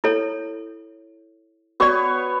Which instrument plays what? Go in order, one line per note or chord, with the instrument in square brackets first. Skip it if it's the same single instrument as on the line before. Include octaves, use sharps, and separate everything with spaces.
[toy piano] E4 A4 C#5
[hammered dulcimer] B3 C#5 C#6 [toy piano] F#4 D5